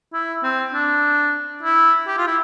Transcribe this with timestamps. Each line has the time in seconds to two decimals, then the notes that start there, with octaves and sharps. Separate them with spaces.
0.13 E4
0.43 C4
0.73 D4
1.63 E4
2.07 G4
2.18 F4
2.27 E4